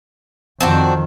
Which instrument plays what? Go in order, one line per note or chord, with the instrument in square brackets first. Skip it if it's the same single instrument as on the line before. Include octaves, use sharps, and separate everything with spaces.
[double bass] F2 D#3 [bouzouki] C4 D4 F#4